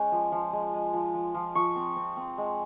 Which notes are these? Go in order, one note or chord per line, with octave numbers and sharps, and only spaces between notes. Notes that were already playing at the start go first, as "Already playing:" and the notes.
Already playing: G#3 C#4 G5
F3
F3
G#3
G#3
F3
F3
F3
F3 C#6
C4
C4
C4
G#3